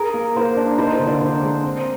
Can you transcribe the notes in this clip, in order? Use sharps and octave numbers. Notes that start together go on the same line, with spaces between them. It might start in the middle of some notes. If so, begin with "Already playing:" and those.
Already playing: G#4 A#4
A#3
A#3 C5
D4
D#4 C5
C5
D3
D5
D3 C5
G#3
C4